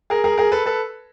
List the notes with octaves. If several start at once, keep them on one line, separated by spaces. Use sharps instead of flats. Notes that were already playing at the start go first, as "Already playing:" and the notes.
G#4 A#4
G#4 A#4
G#4 A#4
A4 B4
A4 B4